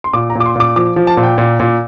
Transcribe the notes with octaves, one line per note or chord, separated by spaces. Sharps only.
C6
A#2 D6
A#5
A#2
D6
C6
A#2 D6
F3 D6
F3
A5
A#2
G5
A#2
A#2